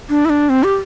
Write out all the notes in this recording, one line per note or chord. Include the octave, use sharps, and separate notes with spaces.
D4
E4
D4
C4
G4